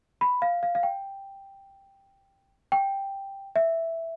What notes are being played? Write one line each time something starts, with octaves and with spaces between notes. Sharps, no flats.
B5
F5
F5
F5
G5
G5
E5